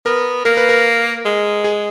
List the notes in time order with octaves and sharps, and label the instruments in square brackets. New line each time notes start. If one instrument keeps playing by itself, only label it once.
[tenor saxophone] B3 [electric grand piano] A#4
[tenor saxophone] A#3 [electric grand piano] A#4
[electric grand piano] B4
A#4
[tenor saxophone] G#3
[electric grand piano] G#4